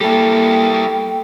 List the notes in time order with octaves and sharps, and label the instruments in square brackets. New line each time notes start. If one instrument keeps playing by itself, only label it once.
[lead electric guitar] G3 E4 [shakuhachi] A#3 [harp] A4 [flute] G5